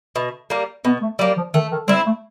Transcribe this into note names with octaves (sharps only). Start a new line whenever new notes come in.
B2
G3 A#3
B2 B3
A3
F#3 G3 A#3
F3
D#3 A3
D#3
G3 C4 E4
A3